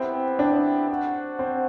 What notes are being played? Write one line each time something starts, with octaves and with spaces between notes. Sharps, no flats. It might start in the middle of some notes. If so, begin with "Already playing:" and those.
Already playing: B3 C4 E4 G4 B4 E5
D4
F#4 C5 F#5
C4